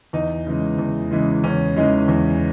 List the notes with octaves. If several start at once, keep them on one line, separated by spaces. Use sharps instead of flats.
E2 D#4
C#3 E3 G#3
E2
C#3 E3 G#3
E2 C#4
C#3 E3 G#3 D#4
E2